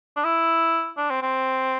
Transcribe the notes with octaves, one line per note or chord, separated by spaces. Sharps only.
D4
E4
D4
C4
C4